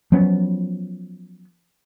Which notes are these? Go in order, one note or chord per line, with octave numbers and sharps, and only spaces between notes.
F3 F#3 B3 C#4